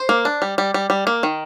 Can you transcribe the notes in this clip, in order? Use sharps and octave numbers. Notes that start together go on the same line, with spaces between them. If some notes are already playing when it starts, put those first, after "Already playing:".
Already playing: C5
A#3
D4
G3
G3
G3
G3
A#3
D#3